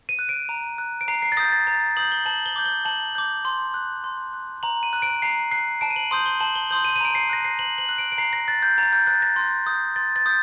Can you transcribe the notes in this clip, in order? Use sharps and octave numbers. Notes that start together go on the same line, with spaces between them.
D#7
F#6
D7
A#5
F#6
D7
A#5 C7
C7
A6
D#6 G6 A#6
A6
A#5 A6
D#6 G6 F#7
G7
A5 F#7
G7
D6 G6
G7
A5 F#7
D6 G6
C6
F#6
C6
F#6
A#5 F#7
D#7
F#6
D7
A#5 C7
F#6 C7
A5 D7
D#7
F#7
C6 D#6 G6 F#7
G7
A5 F#7
G7
C6 D#6 G6 F#7
D#7
D#7
A#5 D7
C7
F#6 A#6
C7
A#5 F#7
F#7
F#6
D7
D7
A#5 C7
A#6
F#6 A6
G6
A#5 A6
G6
F#6 A6
A#6
C6
D#6 G6
C6 A6
A6
D#6 G6